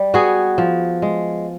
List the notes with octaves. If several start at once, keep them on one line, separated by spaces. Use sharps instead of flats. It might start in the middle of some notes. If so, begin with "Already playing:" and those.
Already playing: G3
B3 F#4 G#4
F3
G#3